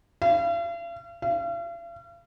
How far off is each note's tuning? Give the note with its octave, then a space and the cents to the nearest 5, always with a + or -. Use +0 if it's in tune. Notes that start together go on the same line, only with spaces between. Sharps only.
F5 -45
F5 -45